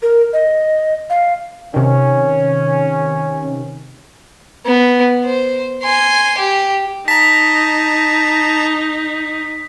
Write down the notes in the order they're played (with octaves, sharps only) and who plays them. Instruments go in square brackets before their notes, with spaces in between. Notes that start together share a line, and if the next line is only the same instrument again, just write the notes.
[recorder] A#4
D#5
F5
[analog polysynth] C3 D#3 [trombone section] C#4
[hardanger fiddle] B3
C5
G#5 C6
G4
[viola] D#4 [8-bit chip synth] A5 A#5 [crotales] B6